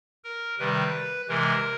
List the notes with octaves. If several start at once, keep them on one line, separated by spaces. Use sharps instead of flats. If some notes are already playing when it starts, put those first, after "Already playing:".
A#4
C3 D#3 G3 B4
C3 E3 G#3 A#4